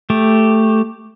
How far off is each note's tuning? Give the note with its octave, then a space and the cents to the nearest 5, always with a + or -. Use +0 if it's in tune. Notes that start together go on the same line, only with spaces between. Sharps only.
A3 +0 G4 +0